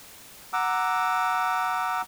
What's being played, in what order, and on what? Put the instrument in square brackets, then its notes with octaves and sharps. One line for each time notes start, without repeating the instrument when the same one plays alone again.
[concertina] F#5 A#5 D6 E6